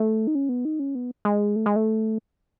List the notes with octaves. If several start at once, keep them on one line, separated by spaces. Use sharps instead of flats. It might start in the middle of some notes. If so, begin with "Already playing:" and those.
Already playing: A3
D#4
C#4
B3
D#4
C#4
B3
G#3
A3
G#3
A3